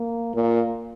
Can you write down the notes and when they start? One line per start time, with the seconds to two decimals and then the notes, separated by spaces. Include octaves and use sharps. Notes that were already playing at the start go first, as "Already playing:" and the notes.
Already playing: A#3
0.35 A#2 A#3